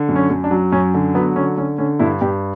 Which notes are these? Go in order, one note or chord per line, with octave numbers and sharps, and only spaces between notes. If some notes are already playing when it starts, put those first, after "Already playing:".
Already playing: D3
F#2
C#4
F#2
D4
F#3
F#2 C#4
D3
F#3 B3
D3 C#4
D3 C#4
D3 C#4
G2 E4
G2 G4